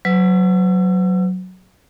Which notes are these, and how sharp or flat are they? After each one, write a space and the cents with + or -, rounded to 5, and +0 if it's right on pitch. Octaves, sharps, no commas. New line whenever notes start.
F#3 +0 B4 +45 E6 +35